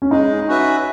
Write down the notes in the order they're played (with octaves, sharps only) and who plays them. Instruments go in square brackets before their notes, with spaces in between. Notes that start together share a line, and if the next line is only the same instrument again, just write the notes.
[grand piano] C#4
[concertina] G#3 [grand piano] D#4
[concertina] C#4 F#4 B4 E5